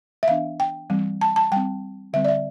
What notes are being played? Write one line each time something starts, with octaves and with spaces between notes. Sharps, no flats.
E5
E3 B3 D4 F5
G5
E3 G3 C4
A5
A5
G3 C4 G5
D3 G3 C4 E5
D5
E5